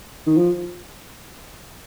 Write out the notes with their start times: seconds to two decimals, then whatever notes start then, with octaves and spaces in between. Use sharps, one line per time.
0.27 D#3
0.37 F3